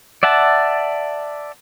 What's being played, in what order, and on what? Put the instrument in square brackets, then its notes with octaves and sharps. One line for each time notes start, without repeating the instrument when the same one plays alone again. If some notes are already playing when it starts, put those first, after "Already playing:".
[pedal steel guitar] D5 E5 F#5 A5